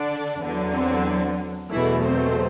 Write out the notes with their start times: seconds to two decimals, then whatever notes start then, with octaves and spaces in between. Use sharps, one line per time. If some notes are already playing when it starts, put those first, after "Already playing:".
Already playing: D3 D4
0.42 E2 D3 F#3
0.74 C4
1.71 E2 B2 E3 F#3 A3 E4
2.03 C4 C5